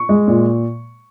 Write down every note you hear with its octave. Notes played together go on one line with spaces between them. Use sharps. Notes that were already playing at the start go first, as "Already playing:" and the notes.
Already playing: C#6
G#3
A#2